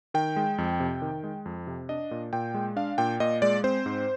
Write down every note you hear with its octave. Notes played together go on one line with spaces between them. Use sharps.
D#3 G5
G#3
F2
C3
D#3
G#3
F2
C3
D4 D#5
A#2
A#2 G5
G#3
D4 F5
A#2 G5
A#2 D#5
G#3 D5
C4 C5
G#2